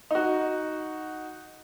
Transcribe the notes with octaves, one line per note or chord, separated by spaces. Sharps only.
D#4 F#4